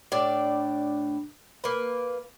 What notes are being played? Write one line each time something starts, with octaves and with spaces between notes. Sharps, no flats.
A2 D4 D5
A#3 B4